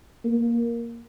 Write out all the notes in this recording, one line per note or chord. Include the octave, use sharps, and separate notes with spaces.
A#3